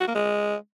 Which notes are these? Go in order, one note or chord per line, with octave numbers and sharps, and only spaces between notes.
F#4
A#3
G#3